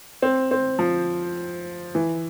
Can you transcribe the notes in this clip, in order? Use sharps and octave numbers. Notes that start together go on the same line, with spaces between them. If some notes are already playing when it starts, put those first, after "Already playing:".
C4
C4
F3
E3